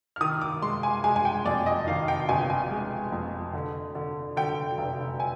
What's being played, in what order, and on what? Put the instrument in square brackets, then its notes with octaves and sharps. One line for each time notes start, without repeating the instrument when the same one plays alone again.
[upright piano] F6
D#3 D#6
D6
G#3 C6
G#5
G#3 G#5
G#5
G5
F2 D5
D#5
D#3 F5
G5
G1 G#5
G#5
G#3
F2
D3
D3
D3 G5
F1
G#5